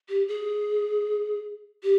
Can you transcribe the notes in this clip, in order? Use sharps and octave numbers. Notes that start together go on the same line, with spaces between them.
G4
G#4
G4